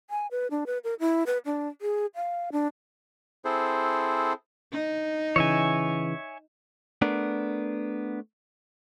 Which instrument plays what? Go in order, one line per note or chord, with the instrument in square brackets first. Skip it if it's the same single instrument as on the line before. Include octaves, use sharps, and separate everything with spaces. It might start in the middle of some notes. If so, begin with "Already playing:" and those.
[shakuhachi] G#5
B4
D4
B4
A#4
E4
B4
D4
G#4
F5
D4
[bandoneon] C4 E4 G#4 A4 C5
[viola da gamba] D#4
[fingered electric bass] C#3 E3 [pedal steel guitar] C#5 E5 G#5
[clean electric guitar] A3 B3 D4 A#4